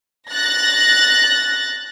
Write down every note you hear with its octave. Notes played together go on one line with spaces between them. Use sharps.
F#6 A6 A#6